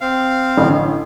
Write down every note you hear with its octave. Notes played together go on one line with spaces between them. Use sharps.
C4 F5
A1 D3